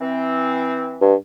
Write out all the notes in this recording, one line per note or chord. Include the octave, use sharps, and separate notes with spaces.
E3 C4
G2